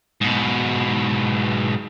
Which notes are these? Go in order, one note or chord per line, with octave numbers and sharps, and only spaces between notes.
G#2 B2